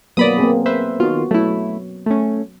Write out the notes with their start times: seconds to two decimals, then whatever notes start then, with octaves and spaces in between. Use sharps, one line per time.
0.17 F#3 A#3 B3 D5 B5 D#6
0.38 A#3 C4 G#4
0.66 B4 C5 E5
1.00 D#3 B3 F4 F#4
1.31 F#3 A3 E4
2.06 A3 C#4